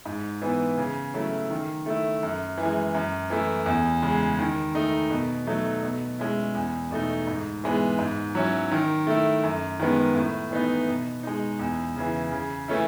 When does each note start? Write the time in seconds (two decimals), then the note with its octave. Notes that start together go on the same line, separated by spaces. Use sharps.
0.05 G#2
0.42 E3 B3 E4
0.78 C#3
1.14 F#3 A3 C#4 E4
1.50 D#3
1.86 A3 E4
2.23 F#2
2.58 E3
2.63 G#3
2.94 F#2
3.30 E3 A3 E4
3.66 E2
4.02 C#3 G#3
4.39 D#3
4.75 A3 D#4
5.10 B2
5.47 F#3 A3 D#4
5.83 B2
6.19 G#3 C#4 E4
6.55 E2
6.91 B2 A3 D#4
7.27 G#2
7.64 E3 G#3 B3
7.99 G#2
8.35 F#3 C#4 E4
8.72 D#3
9.07 A3 E4
9.44 F#2
9.80 D#3 G#3 B3
10.15 A2
10.51 E3 B3 D#4
10.88 B2
11.23 G#3 D#4
11.59 E2
11.96 C#3 E3
12.32 C#3
12.68 E3 A3 C#4 E4